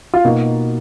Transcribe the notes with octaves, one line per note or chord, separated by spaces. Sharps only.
F4
B2 A#3 D#4 F#4